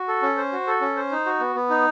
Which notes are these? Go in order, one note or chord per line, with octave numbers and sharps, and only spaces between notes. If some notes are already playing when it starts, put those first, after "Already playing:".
Already playing: F#4
A4
C#4
C5
F#4
A4
C#4
C5
D#4
F#4
B3
B3
D#4